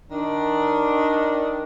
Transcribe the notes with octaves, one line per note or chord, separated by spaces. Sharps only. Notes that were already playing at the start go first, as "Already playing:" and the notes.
D#3 D4